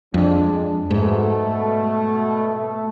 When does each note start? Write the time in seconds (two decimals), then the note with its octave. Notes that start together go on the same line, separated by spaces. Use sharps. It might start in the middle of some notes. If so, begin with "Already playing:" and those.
0.14 F2 G#3 D4
0.90 G#2 B2 A3
2.55 A3